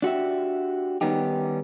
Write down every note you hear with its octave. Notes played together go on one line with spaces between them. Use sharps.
D4 F#4 G4 E5
D#3 G3 B3 C#4 D#4 G4